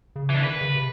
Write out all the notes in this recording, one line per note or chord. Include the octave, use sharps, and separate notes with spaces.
C#3
E3 D4
D#3 B4
C#3
C3